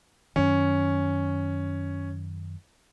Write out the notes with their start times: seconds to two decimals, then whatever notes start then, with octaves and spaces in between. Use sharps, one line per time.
0.36 F#2 D#3 C#4